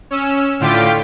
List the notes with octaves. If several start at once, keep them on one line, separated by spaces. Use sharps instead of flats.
C#4 E6
A2 D3 F4 G5 D6 B6